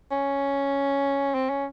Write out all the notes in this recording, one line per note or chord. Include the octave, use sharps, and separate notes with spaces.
C#4
C4
C#4